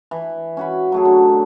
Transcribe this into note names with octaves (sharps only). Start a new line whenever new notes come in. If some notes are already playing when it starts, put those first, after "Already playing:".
E3
C#4 F#4 B5
F#3 A3 G#4
D3